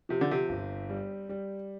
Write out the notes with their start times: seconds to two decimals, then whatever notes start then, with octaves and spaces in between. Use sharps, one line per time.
0.09 C3 F3
0.21 D3
0.31 C3
0.49 G1
0.90 G3
1.29 G3